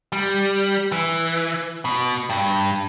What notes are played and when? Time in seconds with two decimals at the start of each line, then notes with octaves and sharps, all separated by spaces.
0.12 G3
0.92 E3
1.85 B2
2.30 G2